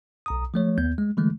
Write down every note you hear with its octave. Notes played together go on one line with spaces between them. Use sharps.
B1 A#5 D#6
F3 A3 C#5
D#2 B3 G6
G#3
D3 E3 G#3 A3